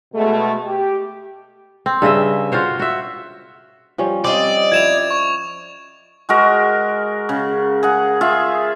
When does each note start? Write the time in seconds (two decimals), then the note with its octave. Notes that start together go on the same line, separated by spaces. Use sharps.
0.15 B2 G#3 A3
0.66 G4
1.86 C4
2.02 G2 C#3 D#5 E5
2.52 F4 F#4 C5 C#5
2.79 F#4 E5
3.98 F3 G3 C#4
4.24 G3 C4 D5 D#5 F5
4.72 F3 E4 G#6 E7 F7
5.11 C#6
6.29 G#3 F#4 A#4
7.29 C#3
7.83 G#4 F#5
8.21 F4 G#4 E5